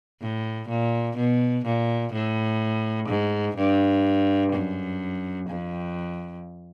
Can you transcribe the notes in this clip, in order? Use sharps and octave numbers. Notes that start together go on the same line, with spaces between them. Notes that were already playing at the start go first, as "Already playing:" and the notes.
A2
A#2
B2
A#2
A2
G#2
G2
F#2
F2